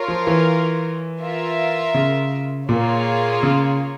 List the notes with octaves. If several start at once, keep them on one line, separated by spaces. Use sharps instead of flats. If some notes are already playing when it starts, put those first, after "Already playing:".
Already playing: F4 A#4 C#5
F3
E3
F4 A#4 E5
C#3
A#2 A#3 F4 G#4 C#5
C#3